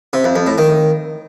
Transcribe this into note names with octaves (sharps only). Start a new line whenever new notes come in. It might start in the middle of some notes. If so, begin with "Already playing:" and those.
C3
F2
F2
A2
D#3